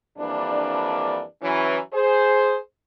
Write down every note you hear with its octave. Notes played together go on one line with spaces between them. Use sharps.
F2 E3 G3 A#3 D4
E3 F#3 C#4
G#4 C5